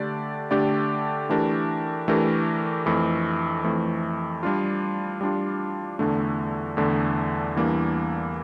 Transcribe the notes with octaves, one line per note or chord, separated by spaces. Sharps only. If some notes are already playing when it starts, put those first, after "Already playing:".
Already playing: D3 A3 D4 G4 D5
D3 A3 D4 G4 D5
E3 A3 D4 G4 A#4
E3 A3 D4 G4 A#4
F2 E3 A3
F2 E3 A3
G3 D4 F4
G3 D4 F4
E2 D3 A3 D4
E2 D3 A3 D4
E2 E3 G3 A#3 D4